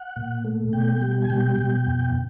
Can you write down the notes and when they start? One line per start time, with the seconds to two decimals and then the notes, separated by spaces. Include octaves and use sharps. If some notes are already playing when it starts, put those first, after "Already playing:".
Already playing: F#5
0.16 A#2
0.45 A3
0.73 B2 G5
1.02 G3
1.22 G#5
1.30 B2 G5
1.58 B2
1.87 F2